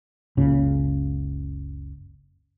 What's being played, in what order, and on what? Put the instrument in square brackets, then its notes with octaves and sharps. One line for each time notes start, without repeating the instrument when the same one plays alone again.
[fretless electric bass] F#1 C#2 C#3